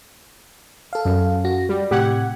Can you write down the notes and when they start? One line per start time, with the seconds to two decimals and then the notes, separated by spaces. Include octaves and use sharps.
0.93 A4 F5
1.05 F#2
1.45 F#4 A#6
1.69 G3
1.91 A2 C3 G4 F#5 G#6